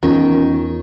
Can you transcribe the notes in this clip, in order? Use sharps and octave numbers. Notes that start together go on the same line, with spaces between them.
E2 D#3 C#4 F4